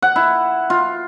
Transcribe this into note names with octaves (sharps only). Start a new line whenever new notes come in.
F#5
E4
F4